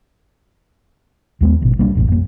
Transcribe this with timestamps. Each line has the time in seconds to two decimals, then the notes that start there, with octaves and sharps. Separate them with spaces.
1.41 D#2 G#3 B3
1.62 D#1 G#1 B2
1.78 C2 G3 A#3 D4
1.95 E1 A1 E2
2.08 F1 A#3